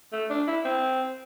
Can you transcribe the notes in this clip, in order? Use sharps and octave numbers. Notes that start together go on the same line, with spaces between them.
A3
D4
E4
C4